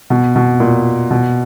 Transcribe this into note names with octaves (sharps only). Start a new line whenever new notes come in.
B2
B2
A#2
B2